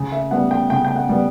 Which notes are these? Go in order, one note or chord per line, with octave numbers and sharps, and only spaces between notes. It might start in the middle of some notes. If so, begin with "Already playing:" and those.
Already playing: C#3
E5
G3 B3 F#5
G5
C#3 G5
G5
F#5
G3 B3